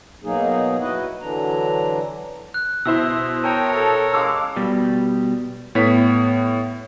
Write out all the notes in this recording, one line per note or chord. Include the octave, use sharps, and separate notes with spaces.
B2 F#3 A#3 D#4 G#4
E4 F#4 B4 D#5 F#5
D3 E3 F#3 D4 A#5
F#6
B2 E4 C5 E6
A#4 C#5 G5 A5
A4
G#3 F5 D6 E6
B2 G3
A2 B3 C#5 B6